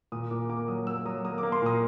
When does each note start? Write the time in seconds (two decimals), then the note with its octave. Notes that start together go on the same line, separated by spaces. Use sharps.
0.12 A#2 D#6
0.30 A#2 D6
0.50 A#3 D6
0.68 F#3 D#6
0.87 A#3 E6
1.06 F#3 D#6
1.24 A#3 D#6
1.38 D6
1.43 A#3
1.52 C6
1.62 A#2 D#6